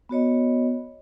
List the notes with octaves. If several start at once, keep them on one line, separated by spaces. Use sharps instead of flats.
B3 F#4 C#5 D#5